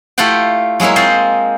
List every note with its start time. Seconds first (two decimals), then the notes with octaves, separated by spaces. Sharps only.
0.18 A3 E4 F4 G4 F#5 G5
0.80 F#3 G#3 A#3 E4 C#5
0.96 C4 F4 C5 D#5